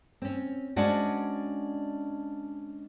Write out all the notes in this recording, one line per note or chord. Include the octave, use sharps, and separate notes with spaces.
C4 C#4
G#3 C#4 D4 F#4 C5 D5